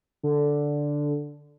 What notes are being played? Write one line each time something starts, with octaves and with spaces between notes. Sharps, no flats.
D3